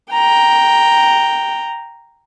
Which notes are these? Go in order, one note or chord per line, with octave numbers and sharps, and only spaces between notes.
G5 A#5